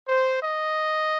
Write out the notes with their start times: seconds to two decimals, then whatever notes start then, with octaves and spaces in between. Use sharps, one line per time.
0.08 C5
0.41 D#5